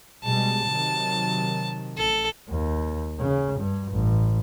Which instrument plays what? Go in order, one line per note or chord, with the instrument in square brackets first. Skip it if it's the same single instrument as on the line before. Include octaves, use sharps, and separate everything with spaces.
[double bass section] B2 G3 G#3 [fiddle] A5
[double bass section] C3 D#3 F#3
[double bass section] A1 [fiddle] A4
[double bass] D#2
C#3
G2
A1